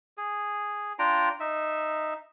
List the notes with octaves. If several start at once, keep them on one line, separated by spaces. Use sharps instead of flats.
G#4
D4 F4 G5 A#5
D#4 E5